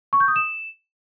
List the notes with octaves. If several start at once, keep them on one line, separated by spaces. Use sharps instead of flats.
C#6
G6
D#6
E7